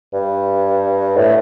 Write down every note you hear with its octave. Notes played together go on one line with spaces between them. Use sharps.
G2
A2